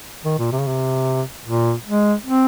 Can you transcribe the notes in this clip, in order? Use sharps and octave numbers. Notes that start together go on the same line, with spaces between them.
D#3
A#2
C3
C#3
C3
A#2
G#3
C4